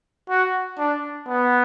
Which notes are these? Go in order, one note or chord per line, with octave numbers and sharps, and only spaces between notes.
F#4
D4
B3